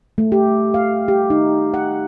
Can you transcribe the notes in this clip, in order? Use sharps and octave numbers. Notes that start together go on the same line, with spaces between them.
A3
G4
F5
G4
D#4
F#5